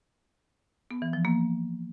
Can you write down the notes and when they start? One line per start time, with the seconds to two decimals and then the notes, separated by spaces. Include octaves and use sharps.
0.91 B3
1.02 E3
1.13 F3
1.25 A#3